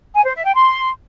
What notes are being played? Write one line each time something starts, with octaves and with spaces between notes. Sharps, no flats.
G#5
C5
E5
G5
C6